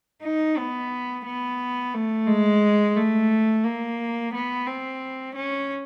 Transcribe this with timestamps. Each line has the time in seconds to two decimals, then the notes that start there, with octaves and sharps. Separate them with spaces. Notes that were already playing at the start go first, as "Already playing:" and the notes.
0.23 D#4
0.58 B3
1.26 B3
1.94 A3
2.28 G#3
2.96 A3
3.64 A#3
4.34 B3
4.67 C4
5.35 C#4